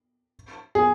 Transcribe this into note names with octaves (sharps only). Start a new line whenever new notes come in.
G#4